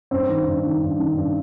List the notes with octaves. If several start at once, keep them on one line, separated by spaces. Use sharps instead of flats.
G2 C4
D#3
G2
D#3
G2
D#3
G2